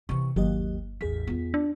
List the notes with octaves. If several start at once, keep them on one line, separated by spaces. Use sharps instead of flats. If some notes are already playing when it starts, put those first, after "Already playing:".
C3 E3 C#6
G1 D#2 F#3 G4 D#5
A1 E2 G#4 B6
B3 F4
D4